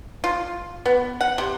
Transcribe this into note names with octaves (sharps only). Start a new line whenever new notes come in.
F4
B3
F#5
C3